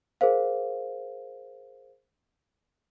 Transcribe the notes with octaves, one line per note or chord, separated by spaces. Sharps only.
G#4 A#4 C5 F5